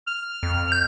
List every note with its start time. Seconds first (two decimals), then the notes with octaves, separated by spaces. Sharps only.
0.07 F6
0.43 F2
0.72 G6